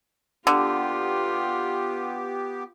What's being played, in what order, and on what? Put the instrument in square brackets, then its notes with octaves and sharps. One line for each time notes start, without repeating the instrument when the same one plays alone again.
[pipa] D3 [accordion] B3 G4 [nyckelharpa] F4